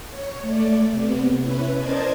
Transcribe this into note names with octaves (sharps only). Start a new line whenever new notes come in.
C#5
A3 D5
C3 B3
C#4 E4 B4
A#4 C5 D5 D#5 A5 G#6